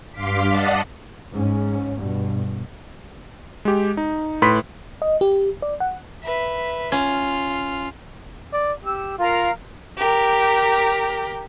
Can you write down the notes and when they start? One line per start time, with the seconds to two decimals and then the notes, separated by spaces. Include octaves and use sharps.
0.12 G2 F5 C6 D6 B6
0.51 D5 D#5 F#5 A5
1.32 G#2 C#4
1.97 G2 B2
3.65 G#3 G4
3.97 D#4
4.42 A2 B4 B5 C6 B6
5.02 D#5
5.21 G4
5.62 D5
5.80 F#5
6.23 B4 E5
6.92 C#4 F4 F6
8.53 D5
8.84 G4 E6
9.19 F4 A#4 F5 A#5
9.98 G4 A#4